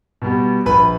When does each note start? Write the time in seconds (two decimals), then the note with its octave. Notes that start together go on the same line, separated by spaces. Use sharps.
0.22 B2 G3 B3
0.66 A#1 B4